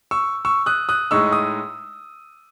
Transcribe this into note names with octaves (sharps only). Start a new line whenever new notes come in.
C#6 E6
C#6 E6
D#6 F#6
D#6 F#6
A2 G#3 D#4 C#6 E6
D#6